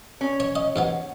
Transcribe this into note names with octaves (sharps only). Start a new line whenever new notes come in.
C#4
C#5
D#5
G#2 G#3 B3